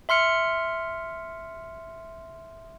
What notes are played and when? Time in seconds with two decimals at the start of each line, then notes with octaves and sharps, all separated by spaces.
0.09 E5 C6 F6 C#7